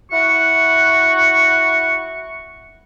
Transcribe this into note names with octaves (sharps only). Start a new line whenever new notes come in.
E4 F#4 F#5 C#6